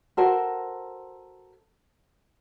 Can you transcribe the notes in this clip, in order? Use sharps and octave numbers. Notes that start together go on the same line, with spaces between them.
F#4 A4 A#4 C5